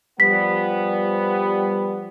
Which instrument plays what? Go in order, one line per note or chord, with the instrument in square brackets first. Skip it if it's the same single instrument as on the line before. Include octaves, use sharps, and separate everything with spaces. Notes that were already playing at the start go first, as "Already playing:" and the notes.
[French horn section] F3 G3 [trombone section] B3 [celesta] B6